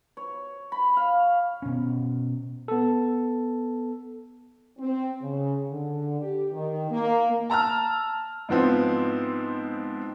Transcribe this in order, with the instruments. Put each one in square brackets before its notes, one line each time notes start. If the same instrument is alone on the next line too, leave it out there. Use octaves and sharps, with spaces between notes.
[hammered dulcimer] C#5
B5
F5
[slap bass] B2 C#4
[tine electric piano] B3 A4
[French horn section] C4
C#3
D3
G4
D#3
A#3
[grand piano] A5 A#5 E6 F6
G#2 F3 B3 C4 E4